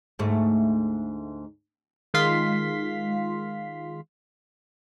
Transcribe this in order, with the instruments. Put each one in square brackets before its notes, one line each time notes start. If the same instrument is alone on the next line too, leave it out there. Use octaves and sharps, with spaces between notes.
[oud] D2 G#2 A3
[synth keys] D#3 G#3 F4 F5 C6 B6